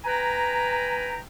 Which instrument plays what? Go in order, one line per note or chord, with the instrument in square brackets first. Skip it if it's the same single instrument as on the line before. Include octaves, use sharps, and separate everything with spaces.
[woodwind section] B4 G5 G#5 A#5